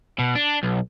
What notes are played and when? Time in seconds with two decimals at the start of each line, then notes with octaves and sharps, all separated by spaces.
0.19 B2
0.35 D4
0.63 B1